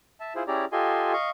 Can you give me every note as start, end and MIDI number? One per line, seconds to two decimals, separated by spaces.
0.20 0.33 76
0.20 0.33 81
0.36 0.43 64
0.36 0.43 65
0.36 0.43 68
0.36 0.43 72
0.47 0.65 61
0.47 0.65 64
0.47 0.65 67
0.47 0.65 68
0.47 0.65 74
0.47 0.65 82
0.72 1.13 65
0.72 1.13 67
0.72 1.13 69
0.72 1.13 75
0.72 1.13 80
0.72 1.13 84
1.13 1.30 75
1.13 1.30 77
1.13 1.30 85